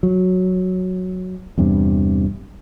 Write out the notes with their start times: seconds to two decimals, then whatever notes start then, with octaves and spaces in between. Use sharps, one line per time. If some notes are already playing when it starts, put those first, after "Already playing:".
0.03 F#3
1.58 E2 G2 C3